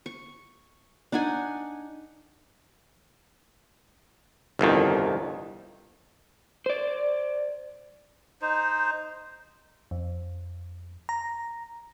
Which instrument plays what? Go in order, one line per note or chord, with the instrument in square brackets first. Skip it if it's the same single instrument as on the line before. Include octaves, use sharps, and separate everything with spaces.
[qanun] C#6
D4 D#4 F#5 G#5
[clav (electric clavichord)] G1 C2 F2 D#3
[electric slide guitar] C5 D5
[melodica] D#4 C5
[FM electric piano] F2
A#5